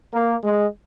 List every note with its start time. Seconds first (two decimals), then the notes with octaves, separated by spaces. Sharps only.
0.13 A#3
0.43 G#3